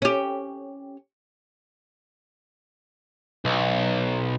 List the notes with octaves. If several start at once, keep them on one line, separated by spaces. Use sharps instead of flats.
C#4 G4
B1